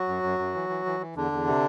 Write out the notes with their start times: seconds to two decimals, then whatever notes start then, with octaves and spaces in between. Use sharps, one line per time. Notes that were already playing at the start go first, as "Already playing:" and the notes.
Already playing: F#3 F#4
0.08 F#2
0.23 F#2
0.39 F#2
0.54 E3
0.70 E3
0.86 E3
1.01 E3
1.16 E2 D3 D4
1.32 E2
1.47 C3